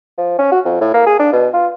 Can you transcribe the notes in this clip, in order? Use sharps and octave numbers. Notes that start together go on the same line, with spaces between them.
F3
C#4
F#4
F2
A2
A#3
G#4
D4
B2
F4